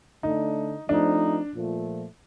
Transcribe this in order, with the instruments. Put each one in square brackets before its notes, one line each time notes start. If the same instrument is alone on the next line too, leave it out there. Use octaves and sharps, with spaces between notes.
[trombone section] D3 A3 D4 [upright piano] D#4
[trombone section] F3 A3 C4 D#4 [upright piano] D4
[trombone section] A#2 F3 A3